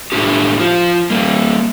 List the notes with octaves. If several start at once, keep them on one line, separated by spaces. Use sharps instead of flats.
A2 A3 D4 G4
F3 F4
G3 A#3